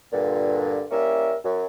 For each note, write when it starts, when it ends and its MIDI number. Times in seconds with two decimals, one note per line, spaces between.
0.12 0.84 43
0.12 0.84 46
0.12 0.84 50
0.91 1.34 55
0.91 1.34 58
0.91 1.34 61
0.91 1.34 64
0.91 1.34 70
0.91 1.34 76
1.44 1.66 42